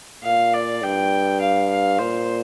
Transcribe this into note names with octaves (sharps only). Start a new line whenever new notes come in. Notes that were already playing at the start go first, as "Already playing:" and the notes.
A#2 F5
D5
G2 G5
F5
F5
A#2 C5